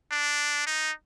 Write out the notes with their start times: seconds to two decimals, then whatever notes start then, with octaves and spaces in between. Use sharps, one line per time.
0.11 D4
0.66 D#4